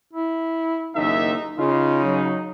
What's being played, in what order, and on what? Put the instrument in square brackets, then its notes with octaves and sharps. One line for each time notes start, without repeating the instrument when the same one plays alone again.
[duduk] E4
[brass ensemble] F#1 D#2 E5 [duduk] D#4
[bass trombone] C#3 [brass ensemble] D#4 [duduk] F4
[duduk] F#3